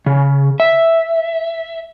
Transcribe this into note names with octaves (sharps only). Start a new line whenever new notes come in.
C#3
E5